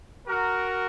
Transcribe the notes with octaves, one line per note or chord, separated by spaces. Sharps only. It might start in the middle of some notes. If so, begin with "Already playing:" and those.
F#4 A#4